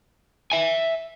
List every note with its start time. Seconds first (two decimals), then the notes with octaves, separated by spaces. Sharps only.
0.52 E5 G#5